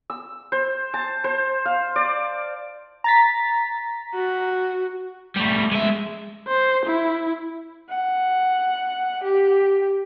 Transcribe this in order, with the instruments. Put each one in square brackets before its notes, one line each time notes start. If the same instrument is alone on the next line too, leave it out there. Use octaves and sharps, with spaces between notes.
[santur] E6
C5
A5
C5
F5
D5
[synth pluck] A#5 A6 B6
[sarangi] F#4
[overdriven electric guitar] G3 A3
G#3 E5
[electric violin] C5
E4
[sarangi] F#5
G4